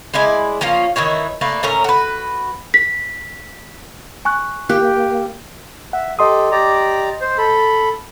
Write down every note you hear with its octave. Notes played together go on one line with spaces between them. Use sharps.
G#3 E4 D5 G#5
F3 A#3 C#4 F4
D#3 E3 E4 C#5
A3 A#3 B4 D5
A2 C#4 A#4 A#5
F#4 B4
B6
G#5 C#6 F#6
A#3 G4 F#6
E5 F#5
G4 A4 D#5 C6 D#6
G4 D5 A#5
C5
A4 B5